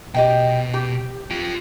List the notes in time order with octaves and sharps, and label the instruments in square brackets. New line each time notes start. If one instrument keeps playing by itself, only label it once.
[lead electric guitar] B2 [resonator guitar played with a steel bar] G4 D#5 G5
[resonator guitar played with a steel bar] G4
[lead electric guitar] F4 G5